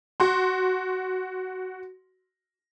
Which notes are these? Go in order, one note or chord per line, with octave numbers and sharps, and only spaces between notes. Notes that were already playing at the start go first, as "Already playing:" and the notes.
F#4 C6